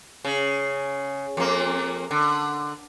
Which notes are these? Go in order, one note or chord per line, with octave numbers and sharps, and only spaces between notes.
C#3
F2 A#3
D3